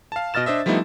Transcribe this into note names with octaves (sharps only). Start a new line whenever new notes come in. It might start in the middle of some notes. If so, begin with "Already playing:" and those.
F5 A5
B2 D#5 F6 A6 E7
D4 C5 D#5 E5
F3 G3 A3 B3 D#4 E4